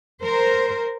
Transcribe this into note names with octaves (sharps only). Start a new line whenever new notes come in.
A#4 C5